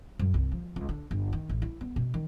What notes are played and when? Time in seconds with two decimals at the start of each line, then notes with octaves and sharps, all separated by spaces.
0.19 F#2
0.34 C2
0.52 F3
0.76 C#2
0.89 D3
1.11 G1
1.33 D#3
1.49 A1
1.62 E4
1.81 B3
1.96 B2
2.14 D#3